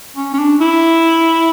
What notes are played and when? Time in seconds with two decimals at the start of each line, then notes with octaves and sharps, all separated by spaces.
0.16 C#4
0.34 C#4
0.39 D4
0.60 E4